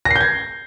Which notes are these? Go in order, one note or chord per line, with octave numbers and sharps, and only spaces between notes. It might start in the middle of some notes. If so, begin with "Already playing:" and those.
A#6
C7
G6
G#6